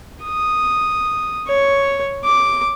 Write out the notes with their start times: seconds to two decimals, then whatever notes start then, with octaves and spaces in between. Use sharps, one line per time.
0.24 D#6
1.48 C#5
2.24 D6